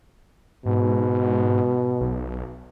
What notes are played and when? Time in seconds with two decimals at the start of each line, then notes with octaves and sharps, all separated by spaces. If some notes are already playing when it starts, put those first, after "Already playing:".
0.66 G#2 B2
2.01 B1